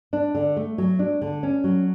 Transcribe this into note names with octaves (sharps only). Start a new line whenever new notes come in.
D4
D3
A3
F#3
D4
D3
C#4
F#3